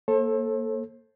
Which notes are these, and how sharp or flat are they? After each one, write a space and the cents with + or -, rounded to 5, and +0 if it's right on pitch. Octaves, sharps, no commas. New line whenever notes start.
A#3 +0 A4 +0 C5 +45